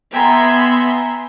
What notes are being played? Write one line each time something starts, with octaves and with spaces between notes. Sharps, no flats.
B3 E5 G5 G#5 A#5 C6